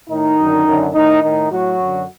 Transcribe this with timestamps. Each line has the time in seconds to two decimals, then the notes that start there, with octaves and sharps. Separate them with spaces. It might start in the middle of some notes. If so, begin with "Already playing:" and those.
0.10 A2 D#3 D#4
0.39 F#2 D3
0.67 F#2 D3
0.94 A2 D#3 D#4
1.23 A2 D#3 D#4
1.51 A2 F#3 F#4
1.80 F#2 D3